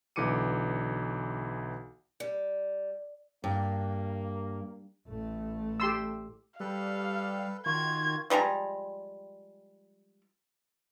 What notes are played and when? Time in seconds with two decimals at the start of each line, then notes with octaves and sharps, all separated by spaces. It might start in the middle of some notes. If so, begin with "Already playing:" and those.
0.16 B1 D3 E3 D6 C#7 D#7
2.20 G3
3.44 G2 A#3
5.08 A1 A3
5.80 G4 C6 E6
6.60 G3 A4 B4 F5
7.66 D#3 F4 F#4 G#6
8.30 F3 G3 G#3 A#5